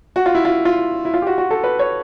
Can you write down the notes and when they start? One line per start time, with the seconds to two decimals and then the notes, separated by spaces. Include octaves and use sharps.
0.16 F#4
0.26 F4
0.35 E4
0.45 F4
0.65 F4
1.05 E4
1.14 F4
1.22 G4
1.27 F#4
1.38 F#4
1.50 A4
1.64 B4
1.79 C#5